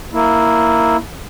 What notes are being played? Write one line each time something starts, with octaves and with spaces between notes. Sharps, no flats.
A#3 E4